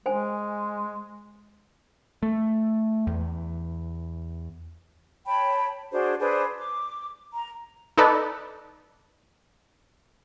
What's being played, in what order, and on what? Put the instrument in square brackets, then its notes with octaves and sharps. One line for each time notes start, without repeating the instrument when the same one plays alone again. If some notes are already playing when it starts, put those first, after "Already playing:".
[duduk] G#3 [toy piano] C5 G#5
[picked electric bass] A3
E2
[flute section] C#5 G5 A5 B5
D4 F#4 G#4 C5
D4 G#4 B4 C5
D6
A#5
[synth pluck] D#4 A4 B4 D5